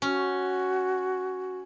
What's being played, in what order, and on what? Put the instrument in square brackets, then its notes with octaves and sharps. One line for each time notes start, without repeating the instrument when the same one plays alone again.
[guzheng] C#4 [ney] F#4